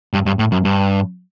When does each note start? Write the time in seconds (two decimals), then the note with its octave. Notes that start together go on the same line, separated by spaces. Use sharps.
0.13 G2
0.26 G2
0.39 A2
0.52 F#2
0.65 G2